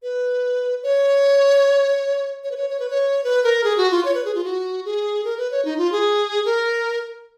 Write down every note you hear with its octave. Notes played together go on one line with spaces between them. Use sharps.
B4
C#5
C#5
B4
C#5
C#5
B4
C#5
B4
A#4
G#4
F#4
F4
C#5
B4
G#4
F4
F#4
G#4
A#4
B4
C#5
D#4
F4
G#4
A#4